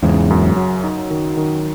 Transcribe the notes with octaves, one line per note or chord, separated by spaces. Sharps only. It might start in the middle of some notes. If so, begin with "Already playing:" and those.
E2 G#2 C#3
F#2
F#3
D#4
D#3
D#3